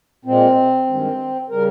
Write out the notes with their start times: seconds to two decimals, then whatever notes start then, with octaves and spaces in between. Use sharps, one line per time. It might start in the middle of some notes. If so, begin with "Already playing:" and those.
0.25 A#2 G#3 C4
0.87 G2 D#3 G#3
1.50 C#3 G3 A#4